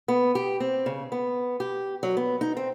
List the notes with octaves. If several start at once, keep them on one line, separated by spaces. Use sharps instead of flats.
B3
G4
C4
C#3
B3
G4
F#3
B3
D#4
C4